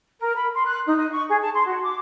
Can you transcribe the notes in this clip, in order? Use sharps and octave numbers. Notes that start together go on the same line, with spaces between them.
A#4
B5
C6
F#6
D#4
D#5
C#6
G#4
A5
C6
F#4
D6